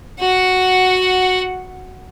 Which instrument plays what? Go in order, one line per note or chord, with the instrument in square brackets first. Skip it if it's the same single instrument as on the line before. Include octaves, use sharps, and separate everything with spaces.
[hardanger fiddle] F#4 F#5